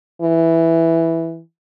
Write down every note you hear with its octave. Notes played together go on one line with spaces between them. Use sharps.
E3